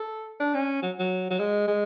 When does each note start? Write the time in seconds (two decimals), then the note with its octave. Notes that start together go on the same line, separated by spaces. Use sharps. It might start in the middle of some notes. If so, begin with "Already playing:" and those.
Already playing: A4
0.40 D4
0.54 C#4
0.82 F#3
0.99 F#3
1.30 F#3
1.39 G#3
1.68 G#3